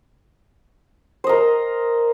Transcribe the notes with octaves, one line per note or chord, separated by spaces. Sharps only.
A#4 C5 D#5